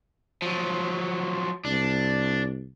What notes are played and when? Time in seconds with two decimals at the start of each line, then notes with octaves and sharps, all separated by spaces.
0.42 F3 F#3
1.65 C2 D4